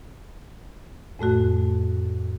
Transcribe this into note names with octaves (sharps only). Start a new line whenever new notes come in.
F2 A2 A3 F#4